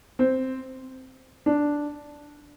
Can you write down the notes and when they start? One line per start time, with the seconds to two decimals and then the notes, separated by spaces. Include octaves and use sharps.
0.19 C4
1.46 D4